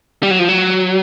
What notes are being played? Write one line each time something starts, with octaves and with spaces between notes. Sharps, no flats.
G3
F#3
F3
F#3